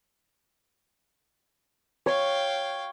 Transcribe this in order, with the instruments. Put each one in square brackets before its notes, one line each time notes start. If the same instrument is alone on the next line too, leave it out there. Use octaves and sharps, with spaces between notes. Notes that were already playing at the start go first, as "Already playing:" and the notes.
[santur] C#5 [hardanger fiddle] F5 G5